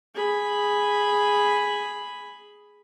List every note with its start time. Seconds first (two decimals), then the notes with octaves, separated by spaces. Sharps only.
0.15 G#4 B5